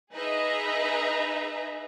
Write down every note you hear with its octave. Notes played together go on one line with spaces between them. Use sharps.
D#4 G#4 B4 D#5 E5 A#5